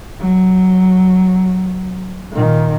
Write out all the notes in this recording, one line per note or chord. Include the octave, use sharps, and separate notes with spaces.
F#3
A#2 D#3